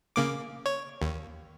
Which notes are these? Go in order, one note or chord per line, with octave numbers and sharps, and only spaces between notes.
C#3 A#3 D6
C#5
D#2